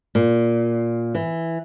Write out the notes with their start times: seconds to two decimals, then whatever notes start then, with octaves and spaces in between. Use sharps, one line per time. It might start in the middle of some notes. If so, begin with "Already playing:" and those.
0.15 A#2
1.15 E3